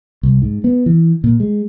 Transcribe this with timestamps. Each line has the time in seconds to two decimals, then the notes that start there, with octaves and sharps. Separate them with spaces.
0.23 C2
0.42 G#2
0.64 B3
0.86 E3
1.24 A#2
1.40 G#3